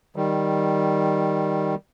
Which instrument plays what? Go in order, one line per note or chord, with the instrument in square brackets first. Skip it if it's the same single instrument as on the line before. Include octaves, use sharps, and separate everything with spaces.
[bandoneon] D#3 G3